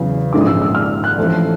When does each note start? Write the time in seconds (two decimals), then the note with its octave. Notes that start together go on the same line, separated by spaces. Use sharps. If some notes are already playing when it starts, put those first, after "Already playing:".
Already playing: E2 C#3 F#3
0.33 A#1 G#2 D#3 G#3 C#4 D6
0.41 D#6
0.46 E6
0.62 E6
0.75 F6
1.04 F#6
1.18 A1 A2 F3 A3